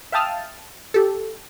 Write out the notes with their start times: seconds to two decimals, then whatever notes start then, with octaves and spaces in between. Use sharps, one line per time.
0.12 E5 F5 G5 A5 D#6 F6
0.94 G4 A4